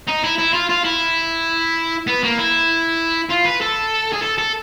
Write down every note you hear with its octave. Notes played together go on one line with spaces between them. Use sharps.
D#4
E4
E4
F4
F4
E4
B3
A#3
E4
F4
B4
A4
G#4
A4
A4